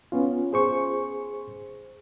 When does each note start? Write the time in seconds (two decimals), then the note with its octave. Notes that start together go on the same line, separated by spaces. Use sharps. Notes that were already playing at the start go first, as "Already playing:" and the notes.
0.12 B3 C#4 F4
0.53 G#4 C5 C#6